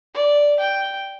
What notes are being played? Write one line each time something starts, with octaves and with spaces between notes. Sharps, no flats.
D5
G5